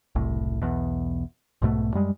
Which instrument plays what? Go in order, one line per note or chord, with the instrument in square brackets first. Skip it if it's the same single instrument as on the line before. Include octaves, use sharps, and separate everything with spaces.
[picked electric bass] F#1 C2 A2
B1 E2 B2
B1 G#2 B2 A3
F#2 G3 G#3